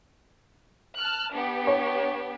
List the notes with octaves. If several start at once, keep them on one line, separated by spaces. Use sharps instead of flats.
A5 F6 F#6
B3 D4 G4
C#5